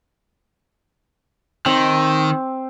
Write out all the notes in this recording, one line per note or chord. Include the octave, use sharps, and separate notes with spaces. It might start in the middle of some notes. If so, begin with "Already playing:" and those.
D#3 C4